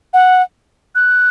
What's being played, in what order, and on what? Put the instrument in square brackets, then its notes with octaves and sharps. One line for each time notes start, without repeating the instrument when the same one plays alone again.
[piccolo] F#5
F#6